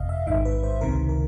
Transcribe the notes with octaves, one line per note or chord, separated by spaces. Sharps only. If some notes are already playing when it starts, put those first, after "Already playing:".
Already playing: G1 F2 C3 D#5 F5
E5
A1 G#2 D#3 E5
B4
C5
C#2 C3 D#3 A#4
A#4